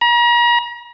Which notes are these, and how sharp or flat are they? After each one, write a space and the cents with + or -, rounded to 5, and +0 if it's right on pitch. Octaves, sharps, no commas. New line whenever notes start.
A#5 +40